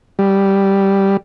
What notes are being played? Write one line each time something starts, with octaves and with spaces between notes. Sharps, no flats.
G3